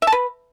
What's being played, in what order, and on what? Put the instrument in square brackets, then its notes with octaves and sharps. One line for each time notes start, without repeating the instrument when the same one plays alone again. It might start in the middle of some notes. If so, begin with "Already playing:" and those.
[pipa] E5
A5
B4